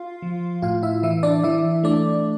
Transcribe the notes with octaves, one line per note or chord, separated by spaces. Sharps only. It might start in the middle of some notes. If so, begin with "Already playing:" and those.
Already playing: F4 F5
F3
A2 F4 F5
E4 E5
E3 E4 E5
D4 D5
E3 E4 E5
A3 D4 D5